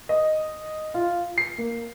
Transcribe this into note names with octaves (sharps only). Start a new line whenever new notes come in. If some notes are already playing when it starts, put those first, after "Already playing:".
D#5
F4
C7
A#3